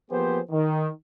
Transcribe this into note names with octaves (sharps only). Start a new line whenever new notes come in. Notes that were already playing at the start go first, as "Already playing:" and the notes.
F3 A#3 B3 G4 G#4 C5
D#3